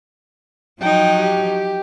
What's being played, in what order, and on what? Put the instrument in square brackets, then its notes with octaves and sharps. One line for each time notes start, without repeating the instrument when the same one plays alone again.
[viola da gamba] F3 F#3 D#4 [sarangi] G5
[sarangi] G4